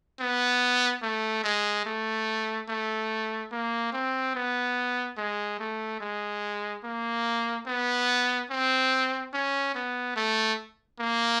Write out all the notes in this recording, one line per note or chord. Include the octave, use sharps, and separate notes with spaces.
B3
A3
G#3
A3
A3
A#3
C4
B3
G#3
A3
G#3
A#3
B3
C4
C#4
B3
A3
A#3